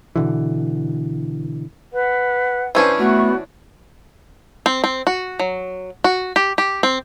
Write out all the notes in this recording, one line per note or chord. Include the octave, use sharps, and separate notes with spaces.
B2 D3 E3
B4 F#5
E3 C#4 D4 C5
A3 B3 F#4
C4
C4
F#4
F#3
F#4
G4
G4
C4